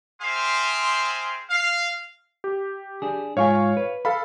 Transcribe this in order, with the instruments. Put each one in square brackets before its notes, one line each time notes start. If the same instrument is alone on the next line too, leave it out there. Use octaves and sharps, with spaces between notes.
[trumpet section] C4 G#4 C5 E5 F5 C6
F5
[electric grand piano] G4
[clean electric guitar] D4 G#4
[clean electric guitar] G#2 F4 G#5 [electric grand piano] C#5 F5 C#6
[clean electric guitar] B4
[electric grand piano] A4 F5 B5